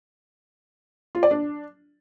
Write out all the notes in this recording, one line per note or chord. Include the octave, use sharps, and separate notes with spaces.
F4
D5
D4